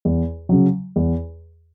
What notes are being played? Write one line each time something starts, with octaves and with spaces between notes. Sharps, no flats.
E2
C#3 F#3
E2